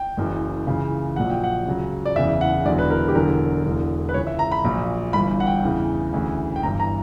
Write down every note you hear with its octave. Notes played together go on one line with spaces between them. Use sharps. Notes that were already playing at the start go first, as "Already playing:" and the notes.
Already playing: G5
F#1 F#2 E3
C#2 C#3 E3
A#1 A#2 F#3 F#5
G5
F#5
C#2 C#3 F#3
D5
F#1 E2 C#3 E3 E5
F#5
E1 E2 D3 F#3 D5
B4
A#4
G4
E1 E2 D3 F#3 A#4
E1 E2 D3 F#3
B4
C#2 C#3 E3 C#5
E5
A#5
B5
A#1 A#2 F#3
G1 G2 E3 B5
F#5
G5
E2 C#3 E3
D2 C#3 E3
G5
G1 G2 E3 A#5
A#5